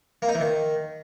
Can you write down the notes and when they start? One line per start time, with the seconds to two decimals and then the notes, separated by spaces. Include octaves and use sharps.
0.22 A#3
0.29 D#4
0.35 E3
0.41 D#3